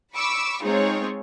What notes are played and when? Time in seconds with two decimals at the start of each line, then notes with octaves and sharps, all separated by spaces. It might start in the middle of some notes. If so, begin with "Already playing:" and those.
0.14 B5 C#6 D6 E6
0.63 G#3 C4 D#4 F4 G#4 C#5